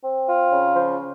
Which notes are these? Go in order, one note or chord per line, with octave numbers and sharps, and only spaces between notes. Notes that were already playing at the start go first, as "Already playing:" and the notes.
C4
F4
C#3
F3